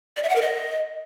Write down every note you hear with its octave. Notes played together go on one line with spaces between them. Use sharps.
D5
E5
F#5
A#4
D#5